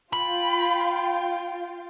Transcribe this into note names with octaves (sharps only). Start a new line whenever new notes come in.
F4 F5 G5 B5